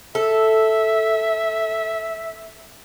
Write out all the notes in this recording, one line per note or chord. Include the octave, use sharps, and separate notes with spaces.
A4 E5